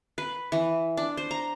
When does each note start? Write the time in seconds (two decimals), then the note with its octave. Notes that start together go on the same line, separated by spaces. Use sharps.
0.18 B4
0.52 E3
0.97 D4
1.17 C5
1.31 A#5